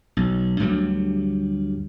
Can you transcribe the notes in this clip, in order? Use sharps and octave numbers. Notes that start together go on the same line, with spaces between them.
B1
D2 G2 F#3 G3